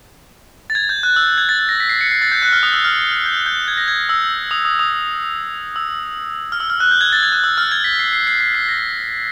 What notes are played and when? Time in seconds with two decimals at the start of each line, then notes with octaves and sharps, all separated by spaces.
0.70 A6
0.75 G#6
0.89 G6
1.03 F#6
1.16 E6
1.27 F#6
1.38 G#6
1.49 A6
1.59 A6
1.69 A#6
1.80 B6
1.89 C7
2.01 C#7
2.11 C7
2.22 A6
2.32 G6
2.42 F#6
2.53 F6
2.63 D#6
2.73 E6
2.84 F6
3.11 F6
3.26 G6
3.46 G6
3.68 G#6
3.77 A#6
3.88 G#6
4.09 E6
4.51 D#6
4.65 D#6
4.79 D#6
5.76 E6
6.52 F6
6.60 E6
6.70 F6
6.80 F#6
6.91 G6
7.01 G#6
7.12 A6
7.23 G#6
7.32 F#6
7.44 E6
7.58 F6
7.71 G#6
7.84 B6
7.99 C7
8.13 C7
8.27 C7
8.41 C7
8.55 B6
8.69 A#6